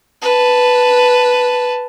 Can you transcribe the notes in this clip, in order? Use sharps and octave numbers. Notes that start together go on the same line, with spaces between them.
B4 A5